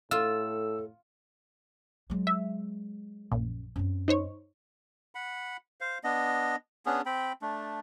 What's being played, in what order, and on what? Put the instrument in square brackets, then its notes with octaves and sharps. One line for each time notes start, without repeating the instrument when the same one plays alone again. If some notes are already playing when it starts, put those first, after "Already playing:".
[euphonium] A2 [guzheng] F4 [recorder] A4 [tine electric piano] E6
[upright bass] F#3 G#3
[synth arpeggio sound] E5
[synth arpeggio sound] A#1 [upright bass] F#2
[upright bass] F#2 C4
[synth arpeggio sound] D#4 C5 C#5
[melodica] F#5 B5
C5 F5
B3 D4 D#5
B3 C#4 D4 G#4
C4 G5 B5
A3 D4